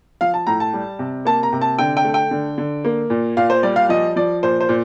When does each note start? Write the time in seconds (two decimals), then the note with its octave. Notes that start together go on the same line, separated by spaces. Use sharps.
0.21 F3 F5
0.34 A5
0.47 A2 A#5
0.60 A5
0.73 G3
0.99 C3
1.25 A#3 A5
1.43 A#5
1.53 C3
1.61 A5
1.78 D3 G5
1.97 G5
2.05 A3
2.14 G5
2.31 D3
2.58 D3
2.85 A#3
3.10 A#2
3.37 A#2 F5
3.50 C5
3.63 G3 D5
3.76 F5
3.89 F3 D#5
4.16 F3 D5
4.43 A#2 C5
4.61 C5
4.69 A#2